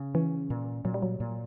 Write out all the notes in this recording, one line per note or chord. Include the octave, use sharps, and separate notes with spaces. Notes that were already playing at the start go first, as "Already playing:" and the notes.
Already playing: C#3
E3 C#4
A#2
A#2 F#3
G3
F#3
A#2